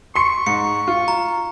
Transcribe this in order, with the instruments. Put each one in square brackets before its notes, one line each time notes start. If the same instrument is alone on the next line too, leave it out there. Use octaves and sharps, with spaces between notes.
[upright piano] C6 C#7 [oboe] C#6
[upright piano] G#2 [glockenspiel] C#7
[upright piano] F4
[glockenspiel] A#5